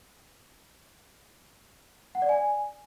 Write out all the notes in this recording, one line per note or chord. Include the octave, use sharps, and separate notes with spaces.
F#5
D5
G#5